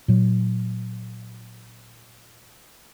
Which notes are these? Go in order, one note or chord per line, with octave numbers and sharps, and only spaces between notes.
A#2 F#3